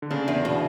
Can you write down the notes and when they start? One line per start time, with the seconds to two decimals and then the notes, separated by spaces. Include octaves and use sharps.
0.02 D3
0.11 C#3 D4
0.28 E2
0.45 B2